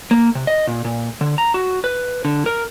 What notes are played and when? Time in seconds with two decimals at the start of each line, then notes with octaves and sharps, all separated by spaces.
0.11 A#3
0.35 C3
0.47 D#5
0.67 A#2
0.85 A#2
1.21 D3
1.38 A#5
1.54 F#4
1.84 B4
2.25 D3
2.46 A#4